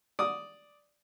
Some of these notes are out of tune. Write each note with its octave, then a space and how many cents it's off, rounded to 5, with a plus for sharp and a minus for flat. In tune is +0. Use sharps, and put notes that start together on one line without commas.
D5 +0 D#6 +0